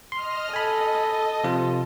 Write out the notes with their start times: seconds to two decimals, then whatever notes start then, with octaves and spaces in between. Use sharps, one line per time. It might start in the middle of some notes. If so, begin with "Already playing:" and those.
0.12 D#5 C6 F6
0.54 A4 D#5 G#5 B5
1.44 C3 F3 F4